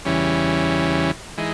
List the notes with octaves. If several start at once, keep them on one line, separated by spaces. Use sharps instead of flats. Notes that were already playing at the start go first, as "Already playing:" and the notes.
E2 C#3 E3 G3 C#4
E3 G#3 D#4